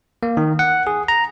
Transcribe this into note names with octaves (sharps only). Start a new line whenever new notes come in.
A#3
D#3
F#5
G#4
A#5